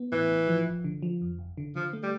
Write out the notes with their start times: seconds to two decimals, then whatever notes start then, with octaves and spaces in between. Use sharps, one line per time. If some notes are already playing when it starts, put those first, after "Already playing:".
Already playing: B3
0.12 A2 E3
0.30 A1
0.48 F3
0.67 G1
0.84 D3
1.02 F3
1.21 F2
1.39 G1
1.57 D3
1.76 D3 F3
1.93 A3
2.03 G3